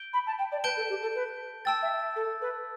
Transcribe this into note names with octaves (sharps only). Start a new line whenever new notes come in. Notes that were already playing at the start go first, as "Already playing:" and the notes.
Already playing: G6 D7 G7
B5
A5
G5
D5
B4 A5 G6 D7 G7
A4
G4
A4
B4
G5 A5 E6 A6
E5
A4
B4